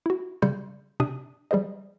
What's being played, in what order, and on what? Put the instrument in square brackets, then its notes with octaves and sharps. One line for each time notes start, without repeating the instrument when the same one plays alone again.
[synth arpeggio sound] E4 F#4
C#3 G3 C6 G6 C#7
C3 D4 D#6 D#7
F3 G3 G#4 C5 D#5